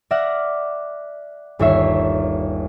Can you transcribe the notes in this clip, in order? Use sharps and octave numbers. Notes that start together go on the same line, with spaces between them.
D5 E5 F#5 F6 A#6
G1 D#2 C#5 E5 C7